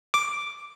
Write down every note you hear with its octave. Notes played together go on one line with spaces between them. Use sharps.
D6